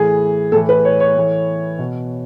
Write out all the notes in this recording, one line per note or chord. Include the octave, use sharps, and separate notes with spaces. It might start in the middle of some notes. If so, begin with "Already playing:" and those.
Already playing: A2 E3 G#4
A2 E3 A4
B4
C#5
C#5
A2 E3
B2